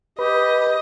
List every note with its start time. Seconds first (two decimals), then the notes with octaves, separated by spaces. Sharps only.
0.19 G4 B4 D#5